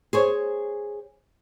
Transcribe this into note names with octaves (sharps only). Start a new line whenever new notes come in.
G#4 C5 C#5